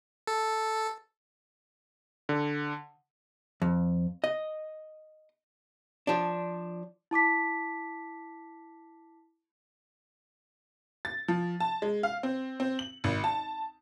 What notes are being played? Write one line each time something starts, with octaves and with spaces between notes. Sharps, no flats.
A4
D3
F2
D#5
F3 D4
E4 A5 D6 B6
A6
F3
A5
G#3
F5
C4
C4
F#7
G#1
A5